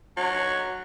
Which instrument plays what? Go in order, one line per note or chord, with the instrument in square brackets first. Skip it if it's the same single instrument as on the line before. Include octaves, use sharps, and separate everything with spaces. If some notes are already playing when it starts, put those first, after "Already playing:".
[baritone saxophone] F#3